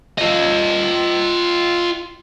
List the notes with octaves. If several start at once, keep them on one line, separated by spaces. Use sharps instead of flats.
F4 D#5